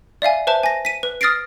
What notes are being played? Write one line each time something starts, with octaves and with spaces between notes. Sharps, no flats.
D5 E5 F5 G#5
B4 C5 E5 A5
G#5 A#6
B6 D#7
B4
D#6 F6 A6 A#6 C7 D7